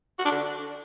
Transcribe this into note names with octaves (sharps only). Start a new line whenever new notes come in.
F#4
D4
D3